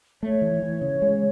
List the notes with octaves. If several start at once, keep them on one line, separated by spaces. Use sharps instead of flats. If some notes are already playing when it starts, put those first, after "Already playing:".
A3 C#5
E3
E3
C#3
G#3